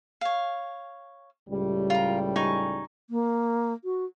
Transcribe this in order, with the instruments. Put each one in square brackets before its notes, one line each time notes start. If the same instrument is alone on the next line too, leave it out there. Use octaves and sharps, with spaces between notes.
[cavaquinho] C#5 F5
[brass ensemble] C#2 A2 G3
[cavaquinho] F4 A#4
D#4 G#5 C#6
[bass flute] A#3
F#4